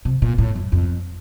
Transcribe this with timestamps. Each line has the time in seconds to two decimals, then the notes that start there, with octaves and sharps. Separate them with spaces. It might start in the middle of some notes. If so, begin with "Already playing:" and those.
0.05 C3
0.22 A#2
0.38 A2
0.55 F#2
0.72 F2